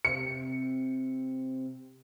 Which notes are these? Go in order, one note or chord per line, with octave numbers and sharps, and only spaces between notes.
C3 C#7